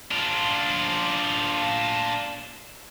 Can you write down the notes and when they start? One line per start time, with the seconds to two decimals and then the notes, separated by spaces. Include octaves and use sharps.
0.11 D4 F4